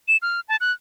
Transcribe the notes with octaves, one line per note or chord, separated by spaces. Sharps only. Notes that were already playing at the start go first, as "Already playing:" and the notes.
E7
F6
A5
F#6